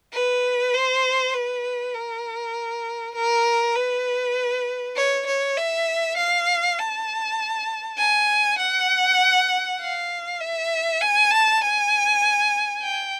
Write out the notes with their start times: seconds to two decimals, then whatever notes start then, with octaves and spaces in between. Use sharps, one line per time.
0.13 B4
0.73 C5
1.34 B4
1.94 A#4
3.16 A#4
3.75 B4
4.96 C#5
5.27 C#5
5.57 E5
6.17 F5
6.78 A5
7.98 G#5
8.59 F#5
9.80 F5
10.41 E5
11.01 G#5
11.31 A5
11.61 G#5
12.82 G5